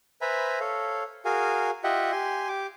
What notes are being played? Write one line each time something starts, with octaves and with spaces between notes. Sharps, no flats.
B4 C5 E5 G#5 A#5 B5
A4 C#5 F5
F#4 G#4 A#4 F5 G#5
F4 G4 D#5 E5 F#5 G5
G4 G#5 C6
G4 D6